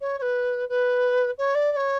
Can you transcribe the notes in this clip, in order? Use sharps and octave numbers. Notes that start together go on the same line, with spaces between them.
C#5
C#5
B4
B4
C#5
D5
D5
C#5